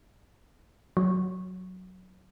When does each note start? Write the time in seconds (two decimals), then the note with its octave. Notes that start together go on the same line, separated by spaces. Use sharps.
0.97 F#3